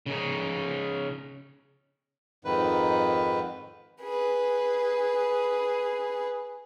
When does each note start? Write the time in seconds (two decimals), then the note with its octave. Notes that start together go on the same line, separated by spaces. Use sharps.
0.06 C#3 D#4
2.45 F2 G#2 D#3 B4
4.02 G#4 B4